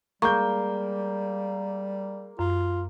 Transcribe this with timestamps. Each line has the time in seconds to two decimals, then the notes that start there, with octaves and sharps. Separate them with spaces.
0.22 G3 G#3 A#3 C#6 G6
2.39 F#2 F4